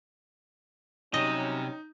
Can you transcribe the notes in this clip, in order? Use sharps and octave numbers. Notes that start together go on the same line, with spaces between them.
C3 F#3 G3 C#4 D#4 D#5